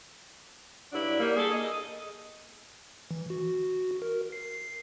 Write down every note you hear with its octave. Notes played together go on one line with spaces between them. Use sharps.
G2 F#3 D4 E4
G3 A#3
G#4 A4
D#5
E3
F#4
A#4
C7